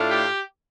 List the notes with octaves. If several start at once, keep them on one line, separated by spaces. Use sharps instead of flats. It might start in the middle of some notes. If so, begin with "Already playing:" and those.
Already playing: A2 A3 D4 F4
G4